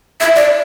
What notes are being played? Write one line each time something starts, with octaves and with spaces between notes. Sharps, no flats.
E5
D5